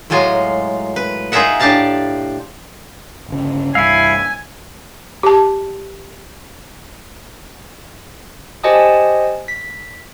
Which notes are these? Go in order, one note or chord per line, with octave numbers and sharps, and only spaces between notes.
A2 F#3 G#3 F4 G#5 A#5
B4
D#4 F4 G#4 A#4 E5 F#5
A2 D4 G4 F5 A5 A#5
G1 C#3
C2 G2 E4 F5 G#5 E6 B6
G4 A5
G4 C5 D#5 G#5 A5 D#6
B6